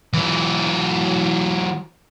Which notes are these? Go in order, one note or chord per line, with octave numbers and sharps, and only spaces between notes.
E3 F#3